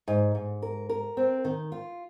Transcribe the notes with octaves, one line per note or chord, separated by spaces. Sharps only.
G#2
G#2
A#4
A#4
C4
D#3
F4